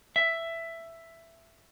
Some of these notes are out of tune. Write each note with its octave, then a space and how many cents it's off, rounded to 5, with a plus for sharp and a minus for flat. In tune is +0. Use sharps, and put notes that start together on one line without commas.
E5 +10